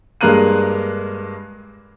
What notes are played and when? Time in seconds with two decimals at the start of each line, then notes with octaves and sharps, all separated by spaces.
0.21 G2 G#3 A#3 A#5 F#6 D#7